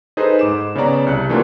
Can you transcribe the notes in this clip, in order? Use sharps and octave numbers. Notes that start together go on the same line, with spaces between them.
D#4 G#4 A4 B4 C5
G#2 D6 E7
C#3 B3 C#5 D5 A#5
C2 F#6 C#7
E3 A3 A#3 D4 F4 F#4